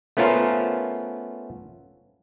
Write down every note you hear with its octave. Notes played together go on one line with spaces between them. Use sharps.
A3 B3 C#4 F4 A#4 C5